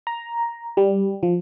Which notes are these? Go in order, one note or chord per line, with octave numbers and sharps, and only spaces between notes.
A#5
G3
F3